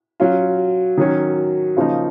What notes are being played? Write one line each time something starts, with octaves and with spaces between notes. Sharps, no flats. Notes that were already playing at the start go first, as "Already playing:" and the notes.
F#3 C#4 F4
D#3 F#3 C#4
C#3 F3 A#3 D#4